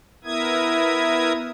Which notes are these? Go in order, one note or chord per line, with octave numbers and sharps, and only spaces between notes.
B3 E4 A#4 E5 D#6 G#6